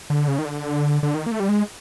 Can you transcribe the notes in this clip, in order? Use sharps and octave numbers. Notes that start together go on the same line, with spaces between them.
D3
C#3
D#3
D3
D3
D#3
A#3
A3
G3
G#3